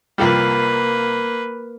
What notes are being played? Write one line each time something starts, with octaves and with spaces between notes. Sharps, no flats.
C2 F3 G3 A#3 B4